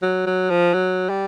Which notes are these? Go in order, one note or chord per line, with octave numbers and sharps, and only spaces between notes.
F#3
F#3
F3
F#3
G3